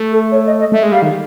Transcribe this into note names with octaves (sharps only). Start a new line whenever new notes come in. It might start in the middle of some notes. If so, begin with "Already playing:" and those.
Already playing: A3
A4
C#5
D#5
D#5
A3 E5
G#3
G3 F5
D#3